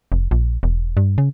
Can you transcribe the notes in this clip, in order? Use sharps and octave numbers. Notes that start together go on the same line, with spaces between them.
F1
A#1
E1
G2
C#3